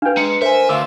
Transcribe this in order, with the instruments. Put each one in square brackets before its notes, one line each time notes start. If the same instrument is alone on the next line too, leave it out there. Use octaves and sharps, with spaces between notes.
[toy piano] D4 B4 [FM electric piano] F5 G5
[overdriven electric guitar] G#3 [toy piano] A#5 [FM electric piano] C#7
[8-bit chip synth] A#4 G#5 [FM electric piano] C5 [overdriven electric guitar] E5
[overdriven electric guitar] D2 [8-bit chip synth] F5 C6 D6 [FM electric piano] E6